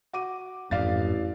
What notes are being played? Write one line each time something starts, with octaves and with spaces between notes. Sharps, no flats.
F#4 D6 D#7
A1 F2 G#2 D5 F5 A6